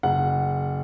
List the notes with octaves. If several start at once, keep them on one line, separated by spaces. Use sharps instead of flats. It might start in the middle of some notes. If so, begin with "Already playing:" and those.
F#1 F#5